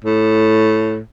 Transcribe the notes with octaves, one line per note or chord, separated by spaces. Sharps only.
A2